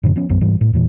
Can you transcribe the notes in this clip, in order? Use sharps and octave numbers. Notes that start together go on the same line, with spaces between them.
F#2 A2 D3
F3 B3 C#4
B1 F#2 B3
G#2 E3 G3
A2
E2 A#2 E3